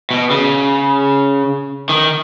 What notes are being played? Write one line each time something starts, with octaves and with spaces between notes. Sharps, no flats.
B2
C#3
D#3